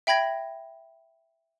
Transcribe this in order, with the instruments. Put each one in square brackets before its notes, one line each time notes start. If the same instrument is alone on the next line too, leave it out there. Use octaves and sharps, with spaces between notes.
[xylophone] E5 G5 B5 G#6 A#6